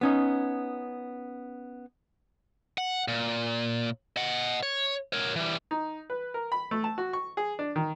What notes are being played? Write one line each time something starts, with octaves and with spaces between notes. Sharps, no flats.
B3 C#4 D#4
F#5
A#2
D#5 F#5
C#5
A#4 C#5
E3 G3
D#4
B4
A#4
B5
A3
A5
F#4
C#6
G#4
D4
D#3